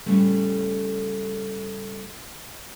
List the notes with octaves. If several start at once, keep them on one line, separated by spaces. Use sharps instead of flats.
A2 C#3 G3 A3